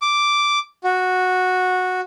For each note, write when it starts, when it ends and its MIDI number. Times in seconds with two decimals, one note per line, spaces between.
0.02 0.59 86
0.84 2.00 66